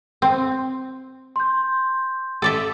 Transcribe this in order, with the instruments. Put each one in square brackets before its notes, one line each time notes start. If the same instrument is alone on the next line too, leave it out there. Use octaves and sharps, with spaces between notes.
[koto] C4
[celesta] C6 G6
[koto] A4 D5 E5